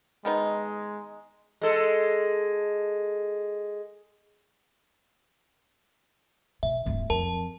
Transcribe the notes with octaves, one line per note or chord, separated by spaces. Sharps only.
D#3 G#3 B3 D#4
G#3 A4
B2 E5
D1 G2
F2 A#4 A5